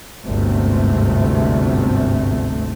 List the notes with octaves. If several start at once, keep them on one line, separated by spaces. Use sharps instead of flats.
G1 D2 G#2 C3 A3 C4